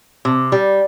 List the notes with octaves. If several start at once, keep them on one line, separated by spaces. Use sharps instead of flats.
C3
G3